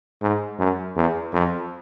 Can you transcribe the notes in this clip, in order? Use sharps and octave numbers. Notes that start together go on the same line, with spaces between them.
G#2
F#2
E2
F2